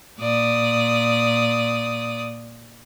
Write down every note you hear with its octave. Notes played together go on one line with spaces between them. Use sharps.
A#2 D5 D#6